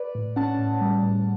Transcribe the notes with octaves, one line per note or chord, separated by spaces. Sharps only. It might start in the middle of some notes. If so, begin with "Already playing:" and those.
Already playing: B4 D5
A2
C#4 F#5 A5
A2
G3
A2